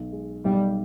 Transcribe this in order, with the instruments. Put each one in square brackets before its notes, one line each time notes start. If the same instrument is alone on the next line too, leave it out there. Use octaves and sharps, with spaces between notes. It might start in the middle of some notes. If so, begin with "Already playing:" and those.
Already playing: [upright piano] B1
G#3
[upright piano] B1 [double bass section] G3